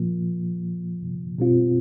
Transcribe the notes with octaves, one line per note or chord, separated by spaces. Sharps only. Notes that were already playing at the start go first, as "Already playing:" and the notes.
Already playing: A#2 F3 A#3
B2 G3 C4 F4